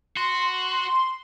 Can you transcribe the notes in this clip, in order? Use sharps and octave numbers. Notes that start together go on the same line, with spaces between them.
F#4 C6